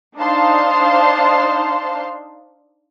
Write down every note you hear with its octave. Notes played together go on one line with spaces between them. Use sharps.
D4 D#4 C5 F5 A5 C6